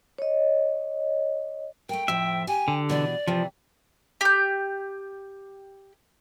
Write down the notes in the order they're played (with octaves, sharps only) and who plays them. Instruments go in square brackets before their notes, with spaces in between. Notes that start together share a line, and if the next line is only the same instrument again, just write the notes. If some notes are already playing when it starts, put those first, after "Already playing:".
[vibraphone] C#5 D#5
[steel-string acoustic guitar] A3 A#4 [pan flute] G5
[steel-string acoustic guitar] F2 A2 F3 [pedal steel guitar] E5
[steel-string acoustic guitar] G4 [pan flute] G#5
[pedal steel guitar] D3
[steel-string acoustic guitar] B2 E3 D4 [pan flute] D5
[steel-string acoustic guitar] C3 E3 [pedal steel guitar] F3
[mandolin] G4 G6